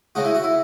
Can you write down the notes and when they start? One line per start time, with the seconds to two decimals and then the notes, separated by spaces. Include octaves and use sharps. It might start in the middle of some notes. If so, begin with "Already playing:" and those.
0.15 C#3 G#3 D#4 F#4
0.25 E4
0.35 F#4
0.44 E4